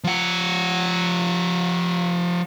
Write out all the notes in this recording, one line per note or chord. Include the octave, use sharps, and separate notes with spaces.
F3 F#5